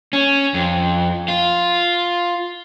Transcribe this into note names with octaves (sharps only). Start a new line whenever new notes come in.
C#4
F2
F4